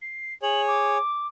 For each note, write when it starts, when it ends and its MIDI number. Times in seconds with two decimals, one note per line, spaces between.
0.01 0.34 96
0.43 0.98 68
0.43 0.98 73
0.43 0.61 102
0.67 1.27 86